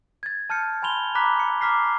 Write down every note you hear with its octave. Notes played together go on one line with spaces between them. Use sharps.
G#6 A6
A5 F6 G6 C#7
G#5 B5 C6 F7 G7
A#5 B5 D6 F#6 B6
C#7
A#5 D6 F6 B6 C7